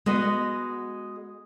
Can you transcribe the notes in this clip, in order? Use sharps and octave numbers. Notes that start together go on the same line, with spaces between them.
G#3 B3 F#4 D#5